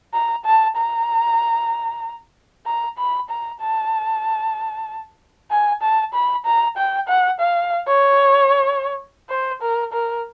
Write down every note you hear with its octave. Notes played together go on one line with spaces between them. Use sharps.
A#5
A5
A#5
A#5
B5
A#5
A5
G#5
A5
B5
A#5
G5
F#5
F5
C#5
C5
A#4
A#4